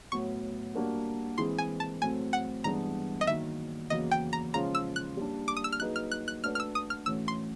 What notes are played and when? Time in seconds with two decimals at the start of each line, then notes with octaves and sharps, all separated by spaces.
0.12 A2 F#3 B3 C#6
0.75 G3 A#3 D4 F#4 A#4
1.38 E3 G#3 C4 E4 G#4 C6
1.58 G#5
1.80 A5
2.01 A2 F#3 A3 C4 G#5
2.33 F#5
2.64 G2 E3 G#3 B3 D4 A#5
3.21 D#5
3.27 D#3 F#3 A#3 E5
3.90 E2 C#3 F#3 A#3 D#5
4.11 G5
4.33 A#5
4.54 C#3 F3 G#3 C#4 F4 A#5
4.75 E6
4.96 F#6
5.17 G3 A#3 D4
5.48 D6
5.57 D#6
5.64 E6
5.72 F6
5.80 F#3 A#3 D#4 G#4 B4 F#6
5.96 F6
6.11 F#6
6.28 F#6
6.43 A3 D4 F#4 B4 D5 F6
6.55 F6
6.60 E6
6.75 D#6
6.90 F6
7.06 A2 E3 A3 C#4 F#4 E6
7.28 C6